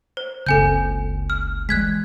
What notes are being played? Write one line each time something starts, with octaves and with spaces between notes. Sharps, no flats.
C5
F#1 C#2 C#3 C4 A4 G#5 G6
F6
E3 G3 G#3 F#6 G#6 B6